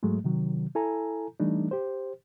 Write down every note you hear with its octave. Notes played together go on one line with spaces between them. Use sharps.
G#2 F#3 G#3 A3
C3 D#3 F#3
E4 A4 G#5 A#5
E3 G3 A3 D4 D#4
G4 C5